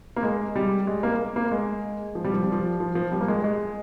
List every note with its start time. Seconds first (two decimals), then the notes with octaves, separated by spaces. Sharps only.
0.16 A#3
0.23 G#3
0.56 G3
0.87 G#3
1.03 A#3
1.36 A#3
1.52 G#3
2.15 F3
2.24 G3
2.33 F3
2.43 G3
2.52 F3
2.80 F3
2.95 F3
3.12 G3
3.21 A#3
3.28 G#3
3.44 G#3